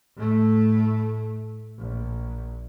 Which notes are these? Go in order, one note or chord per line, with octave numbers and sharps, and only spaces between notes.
A2 A3
A#1